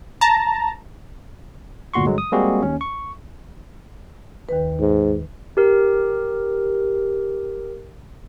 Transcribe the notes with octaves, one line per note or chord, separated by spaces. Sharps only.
A5 A#5
G1 D2 A#2 F#4 C6 C#6
G2 D3 F#3 G#3
D#6
G3 G#3 A#3 C4 F#4 G#4
D#2 C#4
C#6
D#2 D#3 B4
G#2
G4 A#4